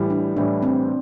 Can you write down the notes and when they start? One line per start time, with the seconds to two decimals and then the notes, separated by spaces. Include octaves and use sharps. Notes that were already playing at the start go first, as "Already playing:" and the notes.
Already playing: A2 E3 G3
0.10 D4
0.36 A2 E3 G3 D4
0.62 C4